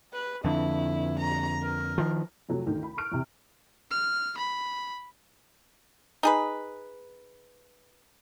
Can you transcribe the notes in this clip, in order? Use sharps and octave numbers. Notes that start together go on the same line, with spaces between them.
B4
F2 D3 E4
A#5
A#4
D#3 F3
F2 C3 F#3 A3
A1 D2 D#3
B5
C#6 F6 F#6 D7
E2 C3
F6
B5
D#4 G#4 B4